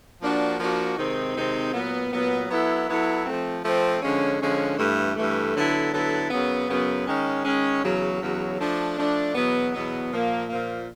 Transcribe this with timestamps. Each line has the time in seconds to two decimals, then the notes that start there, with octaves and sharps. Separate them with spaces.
0.21 F3 A#3 D4 F#4
0.59 F3 A#3 D4 F#4
0.98 C3 D#3 G#3 C4 D#4
1.36 C3 D#3 G#3 C4 D#4
1.74 A#2 F#3 B3
2.12 A#2 F#3 B3
2.49 F#3 B3 E4 A4
2.88 F#3 B3 E4 A4
3.26 F3 A3 C4
3.64 F3 A3 C4
4.02 D3 F3 G#3 C#4
4.40 D3 F3 G#3 C#4
4.78 G2 E3 A3
5.16 G2 E3 A3
5.55 D3 F#3 B3 E4 A4
5.92 D3 F#3 B3 E4 A4
6.31 F#2 C#3 F#3 B3
6.69 F#2 C#3 F#3 B3
7.07 D#3 G#3 C#4
7.45 D#3 G#3 C#4
7.83 E2 C#3 F#3
8.20 E2 C#3 F#3
8.59 F3 A3 D4
8.97 F3 A3 D4
9.35 E2 B2 F#3 B3
9.73 E2 B2 F#3 B3
10.11 A#2 F3 A#3
10.49 A#2 F3 A#3